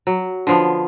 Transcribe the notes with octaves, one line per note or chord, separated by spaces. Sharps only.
F#3
D3 F3 B3